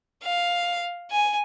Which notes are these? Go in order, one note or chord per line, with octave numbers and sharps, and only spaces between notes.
F5
G#5